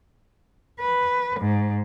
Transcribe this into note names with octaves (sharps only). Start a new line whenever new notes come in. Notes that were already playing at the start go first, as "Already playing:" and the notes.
B4
G#2